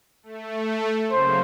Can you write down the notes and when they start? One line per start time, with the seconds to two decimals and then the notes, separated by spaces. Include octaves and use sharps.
0.23 A3
1.11 C#3 F#3 A#3 C5